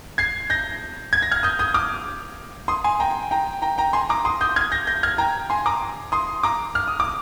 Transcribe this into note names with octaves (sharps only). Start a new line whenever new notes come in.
G#6 C7
G6 A#6
G#6
A#6
F6 G#6
D#6 G6
D#6 G6
D6 F6
C6 D#6
G#5 C6
G5 A#5
G5 A#5
G5 A#5
G5 A#5
G#5 C6
A#5 D6
C6 D#6
D#6 G6
F6 G#6
G6 A#6
G6 A#6
F6 G#6
G5 A#5
G#5 C6
A#5 D6
C6 D#6
A#5 D6
F6
D#6
D6